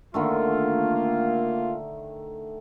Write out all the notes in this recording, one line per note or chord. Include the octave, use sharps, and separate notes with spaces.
D3 D#3 A3 A#3 F4